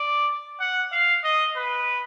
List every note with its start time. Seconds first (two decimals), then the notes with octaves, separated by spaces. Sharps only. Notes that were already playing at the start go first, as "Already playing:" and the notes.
Already playing: D5
0.60 F#5
0.92 F5
1.24 D#5
1.56 B4